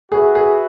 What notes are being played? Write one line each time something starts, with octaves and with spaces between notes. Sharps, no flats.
F#4 G#4 B4 E5
G#4